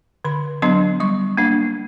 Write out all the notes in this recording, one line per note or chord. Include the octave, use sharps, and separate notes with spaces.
D3 B5
F#3 B3 D4 C6
G3 C#6
A#3 D4